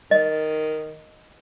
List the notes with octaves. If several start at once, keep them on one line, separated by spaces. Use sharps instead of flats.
D#3 D#5